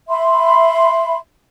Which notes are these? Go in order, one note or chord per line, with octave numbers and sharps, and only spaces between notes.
E5 B5 C6